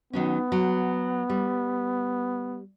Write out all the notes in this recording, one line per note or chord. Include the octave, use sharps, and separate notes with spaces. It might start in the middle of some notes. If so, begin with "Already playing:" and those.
D#3 F#3 B3 C#4
F#3
G3